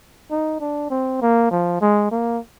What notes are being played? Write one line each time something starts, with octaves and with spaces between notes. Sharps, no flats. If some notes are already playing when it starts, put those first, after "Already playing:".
D#4
D4
C4
A#3
F3
G#3
A#3